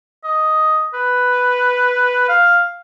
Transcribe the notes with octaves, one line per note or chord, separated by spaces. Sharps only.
D#5
B4
F5